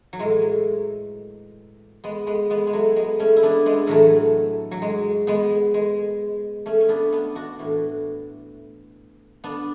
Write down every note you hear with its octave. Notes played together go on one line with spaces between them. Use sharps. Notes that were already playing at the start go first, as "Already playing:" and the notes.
F#3
A2 E3 G#3
G#3 B3
G#3 B3
G#3 B3
G#3
F#3 A3
G#3 B3
A3 C#4
E4
B3 D4
G#3 B3
A2 E3 F#3 A3
F#3
G#3
G#3 B3
G#3
A3 C#4
C#4
B3 D4
B3 D4
D4 F#4
A2 E3
B3 D4